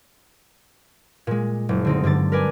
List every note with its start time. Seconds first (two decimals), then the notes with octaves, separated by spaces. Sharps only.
1.27 A#2 G#3
1.69 F#1
1.85 D3 C4 D#4
2.04 G2 D3 G3 A6
2.32 A#4 B4 D5 G#5